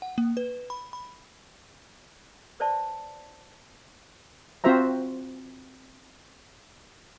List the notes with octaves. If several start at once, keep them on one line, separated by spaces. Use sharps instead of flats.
F#5
A#3
B4
B5
B5
B4 C5 D5 E5 A5
C4 F4 F#4 C5 E5 A#5